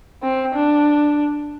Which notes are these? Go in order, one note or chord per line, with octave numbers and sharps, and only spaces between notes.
C4
D4